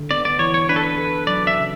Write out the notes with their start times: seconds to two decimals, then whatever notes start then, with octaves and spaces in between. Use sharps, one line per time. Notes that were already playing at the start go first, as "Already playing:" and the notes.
Already playing: D3
0.11 B3 D5
0.25 D5
0.39 E3 C#5
0.54 C#5
0.69 D4 B4
0.76 A4
0.84 B4
0.98 A4
1.27 F#3 D5
1.47 E5
1.57 C#3